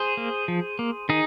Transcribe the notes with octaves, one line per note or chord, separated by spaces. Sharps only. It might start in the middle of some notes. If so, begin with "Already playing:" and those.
Already playing: G#4 C5
A#3
F3
A#3
D#3 D#4 G#4